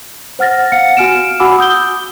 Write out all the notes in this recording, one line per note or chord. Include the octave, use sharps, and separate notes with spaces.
C5 F#5 F6 A6 A#6
F5 F#5 C#7
F#4 G#5 F6 D7 E7
F#4 F#5 G#5 B5 D6 E6
D#6 G6 G7